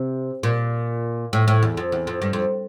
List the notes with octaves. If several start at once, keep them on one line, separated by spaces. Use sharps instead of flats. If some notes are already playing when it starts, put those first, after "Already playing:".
Already playing: C3
A#2
A2
A2
E2
F2
E2
F2
G2
F2